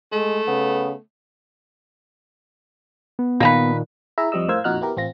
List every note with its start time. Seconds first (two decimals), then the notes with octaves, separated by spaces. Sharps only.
0.12 G#3 A3
0.48 C#3 B3
3.19 B3
3.40 A#2 D#3 A#3 D#4 B4
4.18 E4 G#4 E5 A#5
4.32 F2 F3 G3 D#5 E6
4.48 A2 A#4 C5 F5 E6 G#6
4.64 F2 A#2 D#4 F#4 F6 F#6
4.81 B3 E4 G4 A#4
4.97 A1 C4 F4 A#6